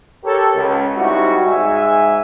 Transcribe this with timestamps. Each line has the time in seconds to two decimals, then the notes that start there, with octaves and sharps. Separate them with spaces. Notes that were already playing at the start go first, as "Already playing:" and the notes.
0.24 G4 A4 A#4 C#5
0.55 C#2
0.97 G3 G#3 C4 D#4 E4 F#4
1.46 G#2 G#3 E5 G#5